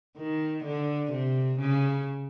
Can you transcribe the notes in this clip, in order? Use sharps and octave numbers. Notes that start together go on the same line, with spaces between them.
D#3
D3
C3
C#3